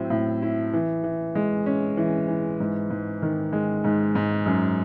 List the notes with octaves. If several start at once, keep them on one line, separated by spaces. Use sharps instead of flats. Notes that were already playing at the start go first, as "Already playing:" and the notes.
Already playing: A2 F#3 C4 E4
A2
E4
E3
E3
G#3
C#4
E3
E3
G#2
G#2
D#3
G#3
G#2
G#2
F#2